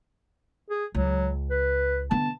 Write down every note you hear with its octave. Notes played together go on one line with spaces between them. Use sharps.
G#4
C#2 F#3
B4
D3 B3 A5